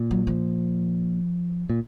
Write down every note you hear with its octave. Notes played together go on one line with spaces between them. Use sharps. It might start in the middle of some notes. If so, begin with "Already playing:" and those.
Already playing: A#2
F#3
F3
A#2